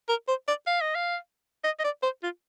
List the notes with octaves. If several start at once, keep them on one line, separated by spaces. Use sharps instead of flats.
A#4
C5
D5
F5
D#5
F5
D#5
D#5
D5
C5
F4